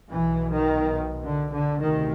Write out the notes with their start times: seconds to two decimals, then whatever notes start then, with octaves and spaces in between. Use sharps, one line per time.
0.12 B1 B2 E3
0.54 D#3
1.24 D3
1.52 D3
1.81 D2 C3 D#3